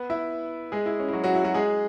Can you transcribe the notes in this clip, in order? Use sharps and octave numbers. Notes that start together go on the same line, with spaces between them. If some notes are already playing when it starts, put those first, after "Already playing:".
Already playing: B3 B4
E4 E5
G#3 G#4
E4
C#4
E4
F#3 F#4
F#3 F#4
E4
F#3 F#4
G#3 G#4